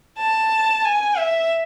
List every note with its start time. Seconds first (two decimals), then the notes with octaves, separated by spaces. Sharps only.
0.19 A5
0.84 G#5
1.18 E5